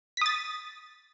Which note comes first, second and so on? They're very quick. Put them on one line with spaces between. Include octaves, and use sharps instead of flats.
B6 D#6 A6